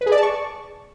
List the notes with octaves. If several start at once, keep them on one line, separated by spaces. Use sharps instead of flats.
B4
G#4
D5
A5
C#6